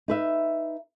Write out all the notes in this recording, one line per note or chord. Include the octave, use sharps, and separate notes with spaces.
D#4 B4 E5